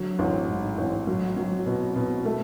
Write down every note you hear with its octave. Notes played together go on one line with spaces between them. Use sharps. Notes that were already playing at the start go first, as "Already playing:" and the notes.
Already playing: D3 F#3
A1
G#2
A1
F#3
F#3
B2
B2
A3